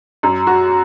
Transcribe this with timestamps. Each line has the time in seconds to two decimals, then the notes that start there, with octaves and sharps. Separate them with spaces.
0.23 F#2
0.47 F#4